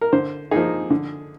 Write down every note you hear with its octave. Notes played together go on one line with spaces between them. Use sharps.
A#4
D3 C5
F3 A#3 D#4 G#4
D3